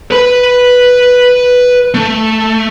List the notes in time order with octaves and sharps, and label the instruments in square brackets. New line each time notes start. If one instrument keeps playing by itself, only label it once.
[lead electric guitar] B4 B5
A3